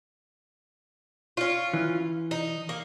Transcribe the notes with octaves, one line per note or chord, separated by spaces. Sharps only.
C#4 F4
E3
D#4
A#3